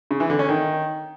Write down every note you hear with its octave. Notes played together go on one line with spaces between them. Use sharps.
C#3
E3
D3
C#4
D#3